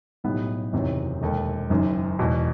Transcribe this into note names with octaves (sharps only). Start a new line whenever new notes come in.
B1 A2 G3 B3
F#1 E2 C3 D#3 F#3
E1 D#2 D#3 A3
F#1 F#2 D#3
E1 E2 B2